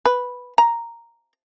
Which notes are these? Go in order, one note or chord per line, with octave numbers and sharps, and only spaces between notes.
B4
A#5